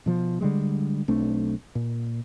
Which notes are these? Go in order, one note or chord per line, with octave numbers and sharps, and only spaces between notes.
B2 F3
D3 G3 G#3
B1 A3 C4 D4
A#2